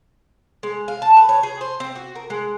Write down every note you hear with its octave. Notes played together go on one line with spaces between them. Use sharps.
G#3
F5
A5
B4
C#5
G#4
C5
C4
F#4
A#4
G#3